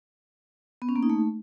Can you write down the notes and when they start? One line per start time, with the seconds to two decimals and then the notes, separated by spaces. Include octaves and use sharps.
0.82 B3
0.89 C#4
0.96 A#3
1.03 D#4
1.10 A3